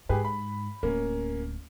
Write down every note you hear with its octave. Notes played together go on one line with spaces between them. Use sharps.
G#2 G4 G#4 B4
B5
D1 A#3 C#4